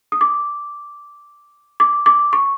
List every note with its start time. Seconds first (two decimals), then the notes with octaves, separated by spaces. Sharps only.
0.12 D#6
0.21 D6
1.80 D6
2.06 D6
2.33 C#6